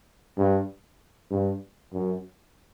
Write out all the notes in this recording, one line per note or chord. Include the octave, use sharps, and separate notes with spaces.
G2
G2
F#2